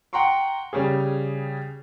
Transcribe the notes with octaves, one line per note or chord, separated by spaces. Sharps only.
F#5 G5 A#5 C6 C#6
C#3 G3 C#4 G#4